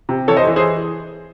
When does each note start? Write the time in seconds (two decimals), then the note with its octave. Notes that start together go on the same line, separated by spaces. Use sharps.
0.09 C3
0.28 E3 A4 C#5
0.37 C5 D#5
0.47 E3
0.56 G#4 C5